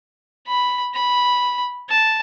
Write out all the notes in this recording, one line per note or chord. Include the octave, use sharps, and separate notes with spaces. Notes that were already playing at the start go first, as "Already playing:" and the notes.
B5
B5
A5